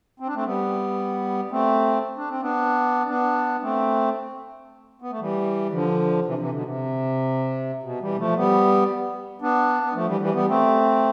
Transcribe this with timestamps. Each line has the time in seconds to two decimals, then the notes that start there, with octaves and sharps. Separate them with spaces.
0.20 C4
0.27 D4
0.35 A3 C4
0.46 G3 B3
1.51 A3 C4
2.17 D4
2.29 C4
2.41 B3 D4
3.09 B3 D4
3.62 A3 C4
5.02 B3
5.11 A3
5.20 E3 G3
5.73 D3 F3
6.26 C3 E3
6.38 C3 E3
6.51 B2 D3
6.65 C3
7.83 B2
8.01 E3 G3
8.18 F3 A3
8.36 G3 B3
9.42 B3 D4
9.82 B3
9.95 F3 A3
10.07 E3 G3
10.21 E3 G3
10.33 G3 B3
10.48 A3 C4